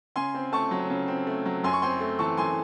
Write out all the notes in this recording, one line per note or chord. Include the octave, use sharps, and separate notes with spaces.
C#3 G#5 C6
C4
A3 A5 C#6
F#3
C#3
C4
A3
F#3
F#2 G#5 C6
C#6
C4 G#5 C6
A3
E3 A5 C#6
F#2 G#5 C6